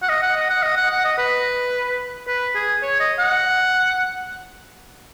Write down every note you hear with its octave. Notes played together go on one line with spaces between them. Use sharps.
F#5
D#5
F#5
D#5
F#5
D#5
F#5
F#5
D#5
B4
B4
G#4
C#5
D#5
F#5